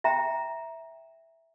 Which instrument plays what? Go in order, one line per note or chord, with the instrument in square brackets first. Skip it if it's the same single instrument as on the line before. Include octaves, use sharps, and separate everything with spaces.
[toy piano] E5 G5 A#5